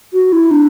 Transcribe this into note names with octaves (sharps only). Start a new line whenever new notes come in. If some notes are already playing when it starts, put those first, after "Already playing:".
F#4
E4
D4